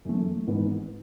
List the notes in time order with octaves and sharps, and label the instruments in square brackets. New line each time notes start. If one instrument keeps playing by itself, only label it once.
[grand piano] F#2 E3 A3
G#1 G#2 E3 B3